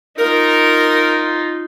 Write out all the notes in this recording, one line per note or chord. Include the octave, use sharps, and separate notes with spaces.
D#4 F4 A#4